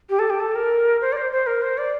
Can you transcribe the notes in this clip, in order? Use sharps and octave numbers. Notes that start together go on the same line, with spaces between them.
G4
A4
G4
A4
A#4
C5
D5
C5
C5
A#4
C5
D5